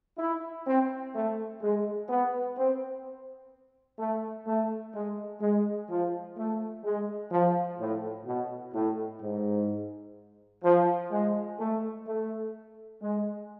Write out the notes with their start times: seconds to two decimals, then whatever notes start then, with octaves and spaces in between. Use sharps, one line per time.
0.18 E4
0.66 C4
1.14 A3
1.61 G#3
2.08 B3
2.57 C4
3.98 A3
4.46 A3
4.93 G#3
5.41 G#3
5.89 F3
6.37 A3
6.83 G#3
7.31 F3
7.79 A2
8.26 B2
8.73 A2
9.20 G#2
10.63 F3
11.11 G#3
11.59 A3
12.06 A3
13.01 G#3